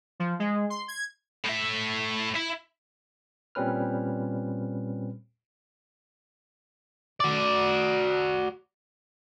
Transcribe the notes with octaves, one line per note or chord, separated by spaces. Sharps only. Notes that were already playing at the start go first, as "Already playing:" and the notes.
F3
G#3
C6
G#6
A2 E5
E4
A#2 G3 C4 C#4 B4 F6
F#4 D5